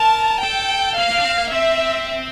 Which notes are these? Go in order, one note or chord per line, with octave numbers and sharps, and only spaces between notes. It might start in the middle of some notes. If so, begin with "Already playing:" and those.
Already playing: A#4 A5
A4 G5
A#3 F5
A#3
D4
C4
A#3
C4 E5